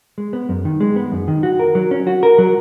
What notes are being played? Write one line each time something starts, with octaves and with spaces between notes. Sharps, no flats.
G#3
B3
F#2
D#3
G#3
B3
F#2
D#3
F#4
A#4
F#3
C#4
F#4
A#4
F#3